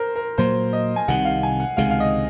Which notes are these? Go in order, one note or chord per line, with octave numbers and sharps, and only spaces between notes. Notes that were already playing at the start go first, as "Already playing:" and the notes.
Already playing: A#4 C5
A#4
A#2 F#3 A#3 C5
D#5
G#5
C2 C3 D#3 F#5
F5
G#5
F#5
C#2 C3 D#3 G#3 F5
F5
D#5